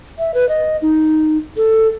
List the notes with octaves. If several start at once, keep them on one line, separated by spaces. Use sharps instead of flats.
E5
B4
D#5
D#4
A4